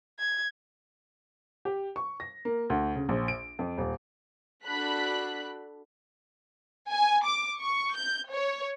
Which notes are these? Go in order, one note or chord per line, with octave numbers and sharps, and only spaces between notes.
G#6
G4
C#6
A#6
A#3
D2
C#3
A#1
D7
F2
D#1
D4 F#4 A4 B5 F#6 B6
G#5
D6
C#6
G6
C#5